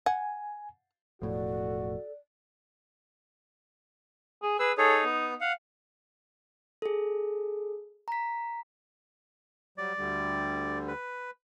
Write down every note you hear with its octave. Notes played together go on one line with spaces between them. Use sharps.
F#5 G#5
E1 A2 F3 F#4 A4 D5
G#4
G#4 B4 E6
D#4 G#4 A4 C#5
B3
F5 F#5
G#4 A4
A#5 B6
F#3 G3 D5
D2 D3 G3
B4